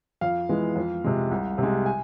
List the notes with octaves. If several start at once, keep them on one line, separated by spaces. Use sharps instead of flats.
F2 F5
E3 G#3 B3
F2
C3 G#3
C2
C3 G#3
G#5